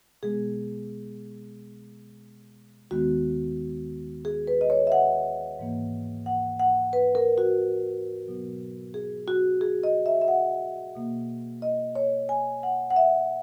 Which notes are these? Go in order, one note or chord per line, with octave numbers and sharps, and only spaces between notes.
B2 G#3 B3 G#4
D#2 D#3 G#3 B3 F#4
G#4
B4
D#5
C#5
E5
F#5
G#2 E3 A#3
F#5
F#5
B4
A#4
F#4
B2 F#3 B3
G#4
F#4
G#4
D#5
E5
E5
F#5
B2 A#3
D#5
C#5
G#5
F#5
F#5
E5